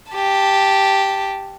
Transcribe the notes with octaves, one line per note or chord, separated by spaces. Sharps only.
G4 A5